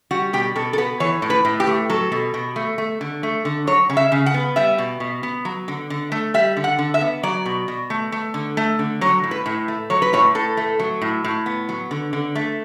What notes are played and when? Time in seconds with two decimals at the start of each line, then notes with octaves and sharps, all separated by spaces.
0.11 G3 F#4
0.33 B2 G4
0.56 B2 A4
0.73 A4
0.78 B3 B4
1.00 E3 C#5
1.22 A2
1.30 B4
1.45 A2
1.60 G4
1.67 A3
1.90 F#3 A4
2.12 B2
2.34 B2
2.56 A3
2.78 A3
3.01 D3
3.23 A3
3.45 D3
3.67 F#3 C#5
3.90 C#3
3.97 E5
4.12 C#3
4.26 F#5
4.34 B3
4.56 G3 E5
4.78 B2
5.00 B2
5.23 B3
5.45 F#3
5.68 D3
5.90 D3
6.12 A3
6.34 G3 E5
6.57 D3
6.64 F#5
6.79 D3
6.94 E5
7.01 B3
7.23 F#3 D5
7.46 B2
7.68 B2
7.90 A3
8.12 A3
8.34 D3
8.57 A3
8.79 D3
9.01 F#3 C#5
9.24 A2
9.31 B4
9.46 A2
9.68 A3
9.90 F#3 C#5
10.02 B4
10.13 A2 C#5
10.35 A2 A4
10.57 A3
10.80 F#3
11.02 A2
11.24 A2
11.46 B3
11.69 F#3
11.91 D3
12.13 D3
12.35 A3